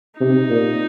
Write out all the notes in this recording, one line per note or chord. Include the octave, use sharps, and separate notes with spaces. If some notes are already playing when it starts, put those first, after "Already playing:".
C3 D#4
A#2